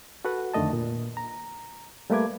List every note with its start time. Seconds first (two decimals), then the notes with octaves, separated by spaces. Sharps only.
0.25 F#4 A4 B4 F#5
0.54 F2 D3 D#3 A3 D#5 A5
0.73 A#2
1.17 A#5
2.10 G3 A3 A#3 B4 D6 G#6